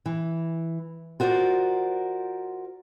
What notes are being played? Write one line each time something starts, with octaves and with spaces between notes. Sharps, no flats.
E3
F4 F#4 A#4 C5 D5